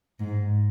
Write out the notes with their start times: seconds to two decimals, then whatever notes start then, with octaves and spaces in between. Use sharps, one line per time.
0.20 G#2